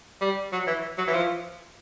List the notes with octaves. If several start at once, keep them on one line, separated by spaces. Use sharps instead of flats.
G3
F#3
E3
F#3
E3
F3